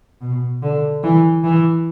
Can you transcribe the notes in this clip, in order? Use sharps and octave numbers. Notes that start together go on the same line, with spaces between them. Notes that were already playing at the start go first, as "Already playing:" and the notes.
B2
D3
E3
E3